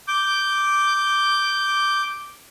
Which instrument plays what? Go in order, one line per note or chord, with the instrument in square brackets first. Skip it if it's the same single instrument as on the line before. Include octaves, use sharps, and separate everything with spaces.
[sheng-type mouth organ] D6 G6